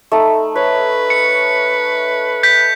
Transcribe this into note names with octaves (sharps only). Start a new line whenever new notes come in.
A3 D#4 B5
B4 C#5
C#7
G6 B6